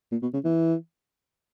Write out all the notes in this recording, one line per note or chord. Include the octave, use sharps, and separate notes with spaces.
A#2
B2
C#3
E3